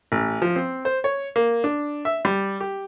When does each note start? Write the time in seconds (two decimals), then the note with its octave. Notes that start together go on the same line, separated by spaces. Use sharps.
0.12 A1
0.42 F3
0.56 C4
0.85 C5
1.04 C#5
1.36 A#3
1.64 D4
2.05 E5
2.25 G3
2.60 G4